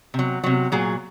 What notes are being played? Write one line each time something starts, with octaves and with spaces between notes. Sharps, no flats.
C3 F#3
C3 F#3
A#2 F#3 G#4